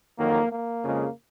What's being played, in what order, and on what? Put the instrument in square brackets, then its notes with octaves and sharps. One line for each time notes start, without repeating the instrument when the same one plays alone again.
[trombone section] F2 D#3 F#3 A#3
A#3
F2 C#3 F3 G#3